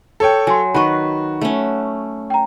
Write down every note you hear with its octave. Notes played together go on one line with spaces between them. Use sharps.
A4 C#5 G5
F#3 G#5 C6
D#3 F#4 B4 B5 C#6
A3 C#4
G5 A#5